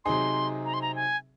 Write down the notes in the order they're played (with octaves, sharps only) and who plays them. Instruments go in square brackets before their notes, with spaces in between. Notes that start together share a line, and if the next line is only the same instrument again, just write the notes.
[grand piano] C3 F#3 C4 D#4 G#4 [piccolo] C6
[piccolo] A#5
C6
A#5
G#5